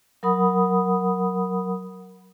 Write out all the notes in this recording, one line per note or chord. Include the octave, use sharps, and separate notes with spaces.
F#3 A#4 F#5 B5 D#6